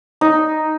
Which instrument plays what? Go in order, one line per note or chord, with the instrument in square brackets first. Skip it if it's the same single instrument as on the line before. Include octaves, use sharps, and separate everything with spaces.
[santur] D#4